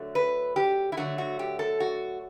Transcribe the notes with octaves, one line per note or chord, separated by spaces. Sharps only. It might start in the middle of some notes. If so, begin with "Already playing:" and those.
Already playing: D3 F#3 A3
B4
G4
E4
D3 F#3 A3 F#4
F#4
G4
A4
F#4